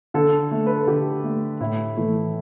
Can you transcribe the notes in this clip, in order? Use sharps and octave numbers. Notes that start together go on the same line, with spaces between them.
D3 A4
A3
B4
A4
D3 G4
A3
A2 E4
E3 A3